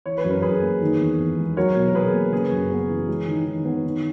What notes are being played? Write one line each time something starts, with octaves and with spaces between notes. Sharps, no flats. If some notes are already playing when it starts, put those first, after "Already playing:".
E3 C#5
B4
F#2
A#4
F#2 G#4 B4
A#3
D#3
E2
E2
G#3
F#3 A#4 C#5
B2
A#4
B2 G#4 B4
A#3
C#3 G#4 B4
F#2
B3
E3
G#3
D#3
D#3
B3
D#3